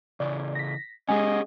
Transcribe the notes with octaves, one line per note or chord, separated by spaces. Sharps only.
C#3 E3 D5
A#6 B6
G#3 C#4 G4 G#4 D#5 F#5 G#5